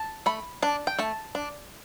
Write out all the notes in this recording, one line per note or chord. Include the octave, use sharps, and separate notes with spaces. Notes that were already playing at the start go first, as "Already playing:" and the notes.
Already playing: A5
A3 B5
D4 A5
G5
A3 A5
D4